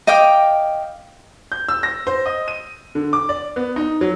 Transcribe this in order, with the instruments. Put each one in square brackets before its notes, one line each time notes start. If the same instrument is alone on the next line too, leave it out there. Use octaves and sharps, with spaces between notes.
[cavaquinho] D#5 F5 G5 D6
[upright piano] G6
E6
A#6
C5
D#5
D#7
D3
D6
D5
B3
D#4
F#3